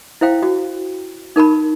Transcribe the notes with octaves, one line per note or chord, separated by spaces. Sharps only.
E4 C5 F5 G5
F#4
D#4 A#4 A5 B5